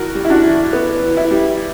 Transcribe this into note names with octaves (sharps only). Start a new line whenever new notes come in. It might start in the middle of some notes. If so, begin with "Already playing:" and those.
Already playing: E3 F#4 A#4
G3
E4
D4 F#4
E3
B3
E3
E4
G3